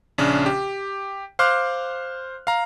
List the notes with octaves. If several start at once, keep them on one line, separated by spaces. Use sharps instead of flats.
A#1 C#3 C#4 D4
G4
C5 F5 C6 D6 F6 F#6
F5 A#5